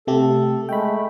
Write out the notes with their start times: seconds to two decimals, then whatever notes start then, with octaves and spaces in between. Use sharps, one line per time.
0.07 C3 A3 G4 A4
0.69 G#3 A3 G5 B5